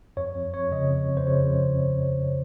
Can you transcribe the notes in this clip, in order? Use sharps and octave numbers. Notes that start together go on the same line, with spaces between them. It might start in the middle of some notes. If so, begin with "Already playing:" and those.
F2 C#5
F2
F2 C#5
C#3 D#5
F2
F2
C5
C#3 C#5
F2